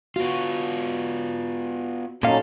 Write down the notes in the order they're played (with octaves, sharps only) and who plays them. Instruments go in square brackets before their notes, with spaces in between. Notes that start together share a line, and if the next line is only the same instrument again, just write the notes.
[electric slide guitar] B3 F4 [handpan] F#4
[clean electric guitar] A#2 F5 [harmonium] F#3 C#4 D#4 [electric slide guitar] A4